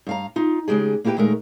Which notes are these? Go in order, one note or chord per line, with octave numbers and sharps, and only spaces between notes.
G2 F5 A#5
D#4 F4
C#3 F3 G#3 G4 G#4
A#3 B3 E4 G4 B4 G5
D#2 A#2 G#3 A3 A#4